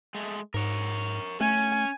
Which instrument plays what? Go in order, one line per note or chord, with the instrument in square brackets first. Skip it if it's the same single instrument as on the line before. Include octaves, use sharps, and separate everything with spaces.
[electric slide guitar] G#3 A3
[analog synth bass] G#2 [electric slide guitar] A#4 C#5
[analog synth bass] A3 [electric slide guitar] C#4 [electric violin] G#5